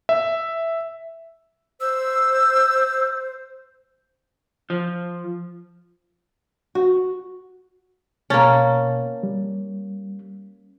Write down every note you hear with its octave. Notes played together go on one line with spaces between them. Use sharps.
E5
C5 E6
F3
F#4
B2 A#3 C#4 A5 A6
G3